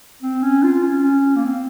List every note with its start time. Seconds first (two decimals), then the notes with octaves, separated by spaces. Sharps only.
0.22 C4
0.42 C#4
0.63 F4
0.83 C#4
1.03 C#4
1.36 A#3
1.45 C4